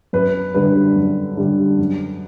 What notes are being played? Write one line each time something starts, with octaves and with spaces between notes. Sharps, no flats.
F#2 B4
D3 G3 B4
F#2
D3 G3
F#2